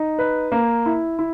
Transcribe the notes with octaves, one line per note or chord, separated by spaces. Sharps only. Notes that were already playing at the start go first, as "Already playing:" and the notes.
Already playing: D#4
B4
A#3
E4
E4